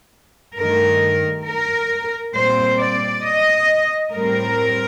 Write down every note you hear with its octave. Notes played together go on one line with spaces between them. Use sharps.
G2 D#3 A3 A#4
A#4
A#2 G3 C4 C5
D5
D#5
A2 G3 C4 A#4